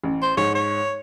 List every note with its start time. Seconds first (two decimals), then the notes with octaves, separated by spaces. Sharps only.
0.04 A1
0.22 C5
0.37 G#2 C#5
0.55 C#5